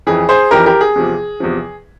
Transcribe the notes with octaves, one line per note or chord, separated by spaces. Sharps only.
F2 E3 G#4
G#4 C5
F2 E3 G4 A#4
G4 A#4
G#4
E2 C3 F3
E2 C3 F3